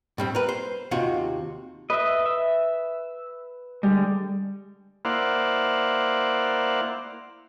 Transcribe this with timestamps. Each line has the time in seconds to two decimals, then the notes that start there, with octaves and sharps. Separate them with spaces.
0.18 A2 G3 C4
0.35 A#4 B4
0.49 C5
0.91 D#2 C3 F4 F#4
1.90 B4 D#5 E5
2.26 E5
3.83 D3 G3 G#3
5.05 A#3 E4 C5 D5 F5 F#5